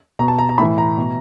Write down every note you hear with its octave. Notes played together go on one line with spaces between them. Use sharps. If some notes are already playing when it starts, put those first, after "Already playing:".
B2 A#5
A5
A#5
A#5
A2 E3 B5
A#5
B2